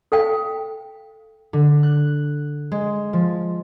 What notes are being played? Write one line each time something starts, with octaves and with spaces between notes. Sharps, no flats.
A4 F5 G5
D3
F#6
G#3
F3